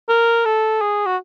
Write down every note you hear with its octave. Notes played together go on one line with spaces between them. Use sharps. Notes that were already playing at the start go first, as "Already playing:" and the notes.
A#4
A4
G#4
F#4